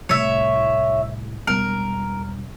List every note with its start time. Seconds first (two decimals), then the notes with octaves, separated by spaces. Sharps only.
0.09 C2 A2 C#5 E5
1.47 E1 G3 A#4